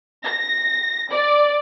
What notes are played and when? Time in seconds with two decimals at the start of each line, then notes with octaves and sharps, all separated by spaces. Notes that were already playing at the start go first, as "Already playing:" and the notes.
0.24 A#6
1.12 D5